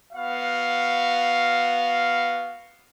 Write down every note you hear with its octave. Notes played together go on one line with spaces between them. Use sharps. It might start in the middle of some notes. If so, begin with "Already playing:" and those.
B3 F#4 F5